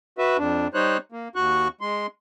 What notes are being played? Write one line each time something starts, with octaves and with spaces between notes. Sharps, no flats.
F#4 B4 E5
F2 D4
G3 D#4 C5 C#5 F#6
A#3
D#2 F#4 C#6 F#6
G#3 C6